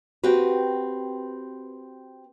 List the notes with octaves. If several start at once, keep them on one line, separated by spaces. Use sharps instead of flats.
C4 F#4 G4 B4